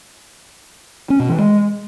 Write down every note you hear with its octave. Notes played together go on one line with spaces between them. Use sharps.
C#4
B2
E3
G#3